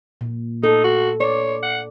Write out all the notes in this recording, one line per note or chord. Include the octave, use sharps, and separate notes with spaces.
A#2
D#4 A4
F#4
C#5 D5
F#5